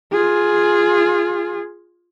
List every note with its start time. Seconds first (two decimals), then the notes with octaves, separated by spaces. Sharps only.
0.12 F4 G#4